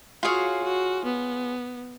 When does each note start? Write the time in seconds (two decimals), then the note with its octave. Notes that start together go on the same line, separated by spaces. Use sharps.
0.23 F4 F#4 G#4 C#5 F5
0.64 F#4
1.05 B3